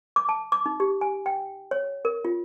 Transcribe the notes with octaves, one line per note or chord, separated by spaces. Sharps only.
D6
A5
D6
D#4
G4
G#5
G5
C#5
A#4
F4